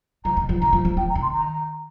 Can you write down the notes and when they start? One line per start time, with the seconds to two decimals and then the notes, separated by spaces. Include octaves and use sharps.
0.25 F3 A#5
0.37 D#3
0.49 F3
0.62 D#3 A#5
0.73 F3
0.85 F3
0.97 F3 G5
1.10 A#5
1.15 D#3
1.22 C6
1.34 A#5